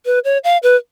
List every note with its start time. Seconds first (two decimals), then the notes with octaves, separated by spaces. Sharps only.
0.06 B4
0.24 C#5
0.44 F5
0.63 B4